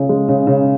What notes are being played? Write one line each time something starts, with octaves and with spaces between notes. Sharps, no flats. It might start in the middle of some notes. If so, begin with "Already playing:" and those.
Already playing: C#2 C#3
G#3
C#3
C#3